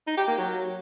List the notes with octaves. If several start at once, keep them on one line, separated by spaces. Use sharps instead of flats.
D#4
G4
A#3
F#3